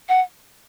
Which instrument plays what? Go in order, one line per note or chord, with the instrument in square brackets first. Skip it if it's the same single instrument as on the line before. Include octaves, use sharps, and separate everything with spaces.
[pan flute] F#5